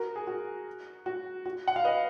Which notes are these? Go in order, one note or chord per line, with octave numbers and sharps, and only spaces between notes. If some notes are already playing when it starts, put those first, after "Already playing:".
Already playing: F#4 A#4
G#4
F#4
F#4
F#4
F#5
F5
B4 D#5